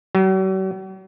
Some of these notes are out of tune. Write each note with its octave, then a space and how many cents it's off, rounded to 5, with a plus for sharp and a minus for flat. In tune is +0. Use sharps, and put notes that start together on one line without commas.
F#3 +45